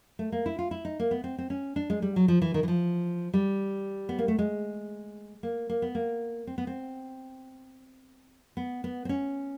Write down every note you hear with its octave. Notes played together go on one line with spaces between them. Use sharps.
A3
A#3
E4
F4
E4
D#4
A#3
B3
C4
C4
C#4
D4
G#3
G3
F#3
F3
E3
D#3
E3
F3
G3
B3
A#3
A3
G#3
A#3
A#3
B3
A#3
C4
B3
C4
B3
B3
C4
C#4